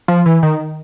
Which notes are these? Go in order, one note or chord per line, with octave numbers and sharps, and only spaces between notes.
F3
E3
D#3